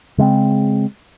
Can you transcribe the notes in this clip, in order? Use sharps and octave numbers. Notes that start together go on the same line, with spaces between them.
C#3 G#3 A3 C4